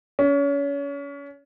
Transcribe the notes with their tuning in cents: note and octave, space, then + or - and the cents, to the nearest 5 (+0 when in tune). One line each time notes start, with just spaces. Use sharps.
C#4 +30